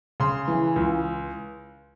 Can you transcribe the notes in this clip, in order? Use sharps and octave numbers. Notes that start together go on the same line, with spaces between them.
C#3 C6
E3
C#2